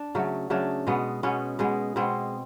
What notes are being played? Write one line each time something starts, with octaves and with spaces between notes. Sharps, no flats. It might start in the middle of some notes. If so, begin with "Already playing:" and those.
Already playing: D4
C#3 F#3 A3
C#3 F#3 A3 D4
B2 G#3 B3
B2 G#3 B3 C#4
B2 G#3 B3
B2 G#3 B3 C4